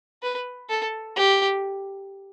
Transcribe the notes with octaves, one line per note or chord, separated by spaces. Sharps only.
B4
A4
G4